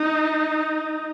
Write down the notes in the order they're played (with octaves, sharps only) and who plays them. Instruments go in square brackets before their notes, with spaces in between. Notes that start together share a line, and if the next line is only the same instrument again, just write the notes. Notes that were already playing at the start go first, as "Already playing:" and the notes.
Already playing: [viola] D#4